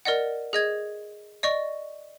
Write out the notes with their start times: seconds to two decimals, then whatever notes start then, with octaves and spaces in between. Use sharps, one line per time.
0.05 A#4 D5 D#5 F#5
0.53 G#4 D#5 G#6
1.43 D5 D#5 C#6